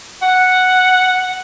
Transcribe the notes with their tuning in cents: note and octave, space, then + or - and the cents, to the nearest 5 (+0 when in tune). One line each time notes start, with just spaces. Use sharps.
F#5 +0